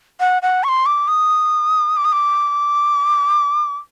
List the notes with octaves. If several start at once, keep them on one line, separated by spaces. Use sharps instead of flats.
F#5
F#5
C#6
C6
D6
D#6
D6
D#6
D6